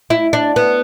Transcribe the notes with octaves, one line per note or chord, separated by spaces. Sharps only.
E4
D4
B3